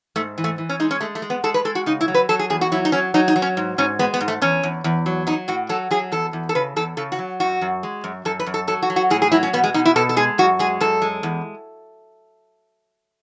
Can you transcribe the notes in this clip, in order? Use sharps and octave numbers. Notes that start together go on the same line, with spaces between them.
G#2 A3
E3
A3
E3
C#4
G#3 D#4
C#4
G#3 A3
A3
G#3
B3
G#3 A4
B4
G#3 A4
F#4
C#3 D#4
E4
F#3
B4
F#3 A4
G#4
E2 G#4
F#4
F#3 E4
D#4
F#3 C#4
F#3 D#4
D#4
F#3
C#4
G#2
G#2 C#4
G#3 B3
B3
G#2
A3
E2 C#4
E2
E2
F#3
F#3 D#4
A2 F#4
F#3 A4
F#3 G#4
E2 A4
E2
A4
C#3 B4
E2 A4
C#3 A4
F#4
F#3
F#2 F#4
F#2
G#3
F#2
F#2 A4
B4
F#2
A4
F#3 A4
F#4
F#3
F#4
A2 G#4
G#4
F#3 E4
C#4
B2 B3
G#3
B2 D#4
E4
B2 A4
A4
G#3 G#4
F#2 F#4
G#3 G#4
F#2 A4
G#3
E2